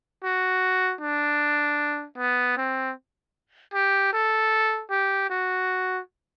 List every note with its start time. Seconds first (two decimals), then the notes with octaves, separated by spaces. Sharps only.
0.24 F#4
1.01 D4
2.18 B3
2.57 C4
3.74 G4
4.13 A4
4.91 G4
5.30 F#4